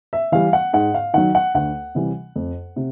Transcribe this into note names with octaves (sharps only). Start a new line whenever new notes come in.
E5
E3 G3 F5
F#5
G#2 F#5
F5
D#3 F#3 F#5
F#5
D2 F#5
C3 E3 G3
F2
C3